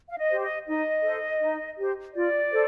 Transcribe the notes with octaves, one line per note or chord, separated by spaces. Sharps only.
F5
D#5
G4 C5
D#5
D#4 D#5
A4 C5
D#4
G4 C5
F4 D5
A4 C5